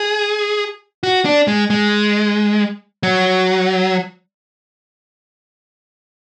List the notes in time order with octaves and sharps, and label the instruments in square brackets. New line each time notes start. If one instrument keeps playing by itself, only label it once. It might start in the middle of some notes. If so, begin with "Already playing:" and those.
Already playing: [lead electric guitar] G#4
F#4
D4
G#3
G#3
F#3